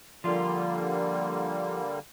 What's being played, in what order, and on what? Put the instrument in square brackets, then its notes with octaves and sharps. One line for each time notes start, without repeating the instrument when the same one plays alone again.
[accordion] D3 G3 A#3 [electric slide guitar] F3 F4